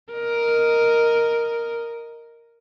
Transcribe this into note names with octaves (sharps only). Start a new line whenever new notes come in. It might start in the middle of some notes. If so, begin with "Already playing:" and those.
A#4 D#5